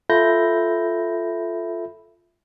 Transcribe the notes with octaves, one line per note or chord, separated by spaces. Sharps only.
F4 A4 E5 B5 G6 A#6